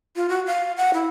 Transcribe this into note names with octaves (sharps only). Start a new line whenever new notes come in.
F4
F#4
F5
F#5
E4